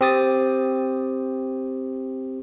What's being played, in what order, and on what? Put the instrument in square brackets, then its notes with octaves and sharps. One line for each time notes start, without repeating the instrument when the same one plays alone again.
[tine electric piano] C4 G4 D#6 A6